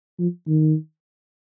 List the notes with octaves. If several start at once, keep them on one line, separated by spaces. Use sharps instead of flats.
F3
D#3